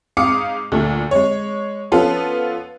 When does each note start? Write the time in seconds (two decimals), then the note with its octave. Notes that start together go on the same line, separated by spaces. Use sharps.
0.17 G#2 F5 D6 D#6 C#7
0.72 D2 A#2 A3
1.11 G#3 C#5
1.92 F3 B3 C#4 F4 A4 B4